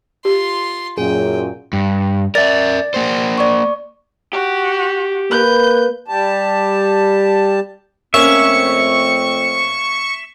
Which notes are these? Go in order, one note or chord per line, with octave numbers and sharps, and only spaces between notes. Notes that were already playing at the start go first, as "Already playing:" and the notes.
F4 G4 C6
F#2 A#2 G#4 G5
G2
A#4 D5 E5 A6
A#3 C5
D5 C#6
F#4 G4
A#3 B4 G6
G3 G4 A5
F2 A3 A#3 C4 C#4 E5 C#6